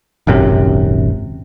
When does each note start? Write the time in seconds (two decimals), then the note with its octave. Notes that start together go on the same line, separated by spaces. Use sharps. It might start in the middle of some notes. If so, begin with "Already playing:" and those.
0.27 D#1 G#1 F#2 C3